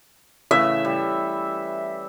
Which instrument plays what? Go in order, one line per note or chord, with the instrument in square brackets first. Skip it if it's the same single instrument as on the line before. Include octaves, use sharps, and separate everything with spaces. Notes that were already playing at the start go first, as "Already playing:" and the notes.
[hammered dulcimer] A2 C#3 E3 [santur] E5
[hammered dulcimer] G3